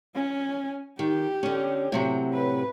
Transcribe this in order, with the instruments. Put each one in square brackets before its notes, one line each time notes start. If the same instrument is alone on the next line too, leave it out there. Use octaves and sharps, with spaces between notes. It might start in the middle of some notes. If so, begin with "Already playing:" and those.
[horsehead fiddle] C#4
[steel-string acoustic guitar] D#3 [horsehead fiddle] G4
[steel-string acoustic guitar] D3 C#4
A2 C3 F#3
[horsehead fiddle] B4